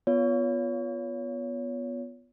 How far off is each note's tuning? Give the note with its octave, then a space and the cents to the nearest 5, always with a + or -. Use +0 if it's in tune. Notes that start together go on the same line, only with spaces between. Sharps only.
B3 +0 F4 +0 C#5 +30